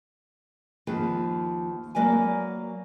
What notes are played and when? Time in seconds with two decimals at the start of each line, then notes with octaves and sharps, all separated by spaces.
0.87 D#2 F3 B4
1.95 F#3 A#3 B4 D5 G#5